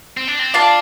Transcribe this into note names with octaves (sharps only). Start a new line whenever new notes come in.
C4
D4
C4
D4 F4 D5 F5 A5